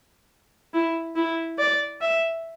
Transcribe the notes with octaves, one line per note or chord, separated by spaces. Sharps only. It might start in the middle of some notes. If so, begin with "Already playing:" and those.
E4
E4
D5
E5